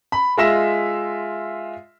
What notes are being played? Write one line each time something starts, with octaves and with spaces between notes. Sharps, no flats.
B5
G#3 F4 E5 A#6 E7